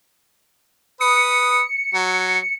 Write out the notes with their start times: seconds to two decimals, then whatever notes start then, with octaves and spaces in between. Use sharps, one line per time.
1.01 B4 D#6 C#7
1.94 F#3